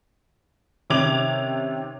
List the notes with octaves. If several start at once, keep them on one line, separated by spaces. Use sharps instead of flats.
C3 D#3 C#4 D6 G#6 F7